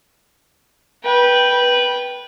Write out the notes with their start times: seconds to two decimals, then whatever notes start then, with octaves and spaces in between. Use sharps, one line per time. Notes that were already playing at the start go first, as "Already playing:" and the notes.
1.04 B4 G5